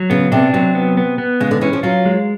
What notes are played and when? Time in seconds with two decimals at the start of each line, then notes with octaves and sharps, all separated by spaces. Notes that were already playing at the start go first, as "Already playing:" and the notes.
Already playing: F#3
0.10 C#3 B3
0.32 C3 D4
0.53 C3 F#3
0.75 B3
0.97 B3
1.18 B3
1.40 C#3 G#3
1.51 D3
1.61 E3 C#4
1.73 F3
1.83 F#3 F4
2.05 G#3